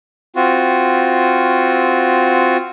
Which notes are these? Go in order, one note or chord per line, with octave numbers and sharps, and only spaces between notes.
C4 F4 F#4